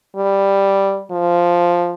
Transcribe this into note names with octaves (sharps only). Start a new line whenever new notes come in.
G3
F3